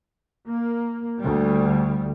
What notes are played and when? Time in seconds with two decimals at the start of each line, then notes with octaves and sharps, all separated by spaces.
0.48 A#3
1.19 D2 G3